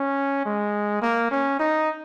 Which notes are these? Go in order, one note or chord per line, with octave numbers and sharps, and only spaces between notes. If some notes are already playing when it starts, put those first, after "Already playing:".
Already playing: C#4
G#3
A#3
C#4
D#4